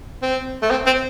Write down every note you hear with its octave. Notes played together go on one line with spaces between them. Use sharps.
C4
A3
C4
C4